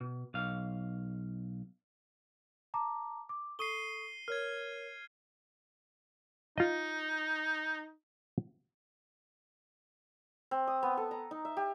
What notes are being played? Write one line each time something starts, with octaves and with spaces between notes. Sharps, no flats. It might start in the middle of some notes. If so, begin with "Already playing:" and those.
B2
B1 F5
A5 A#5 D6
D6
A4 C#6 D#6 C7 D#7 G7
A#4 C#5 F6 G#6
D#4 F4 D#5
C4
D#6
B3
A4
A#5
D#4
E5
G4